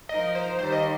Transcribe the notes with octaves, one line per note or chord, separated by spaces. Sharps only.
F3 D#4 A#4 D#5
C5
D#2 D#3 G3 A#3 C5
D#5